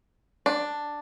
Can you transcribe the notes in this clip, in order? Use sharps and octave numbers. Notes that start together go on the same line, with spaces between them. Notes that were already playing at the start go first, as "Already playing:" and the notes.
D4